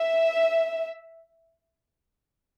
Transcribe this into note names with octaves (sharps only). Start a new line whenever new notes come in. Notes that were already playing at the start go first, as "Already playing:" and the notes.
Already playing: E5